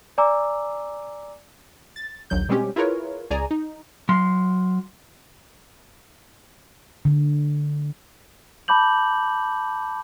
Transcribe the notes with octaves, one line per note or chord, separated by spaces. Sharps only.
D5 G#5 A#5 D6 E6
A6
A#1 D#2 F#3 G6
B2 G3 G#3 C4 C#4 G4
E4 F4 G#4 A#4 B4 C#5
C#2 G#4 D5 G#5 A#5
D#4
F#3 C6
D3
A5 B5 D6 G6 F#7